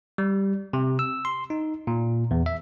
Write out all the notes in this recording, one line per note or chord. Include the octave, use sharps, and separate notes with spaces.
G3
C3
E6
C6
D#4
A#2
E2
E5